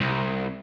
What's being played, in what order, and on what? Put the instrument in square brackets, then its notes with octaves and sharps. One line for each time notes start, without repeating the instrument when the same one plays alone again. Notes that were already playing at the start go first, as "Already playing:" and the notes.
[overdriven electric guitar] C2